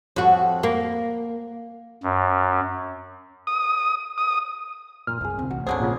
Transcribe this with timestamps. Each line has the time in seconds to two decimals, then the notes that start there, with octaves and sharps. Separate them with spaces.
0.16 F2 F#4
0.63 A#3
2.04 F#2
3.47 D#6
4.18 D#6
5.07 F#2 A#2 D#4 F6
5.21 C2 F#2 G#4
5.38 D#1 C#3 C4
5.51 A1 F#4
5.67 D2 G#2 D3 F#3 G#4 C5
5.79 A#1 C#3 A#3 F4